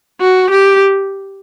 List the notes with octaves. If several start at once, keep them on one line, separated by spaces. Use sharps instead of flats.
F#4
G4